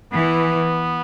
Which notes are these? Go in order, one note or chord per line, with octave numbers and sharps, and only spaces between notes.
E3 B3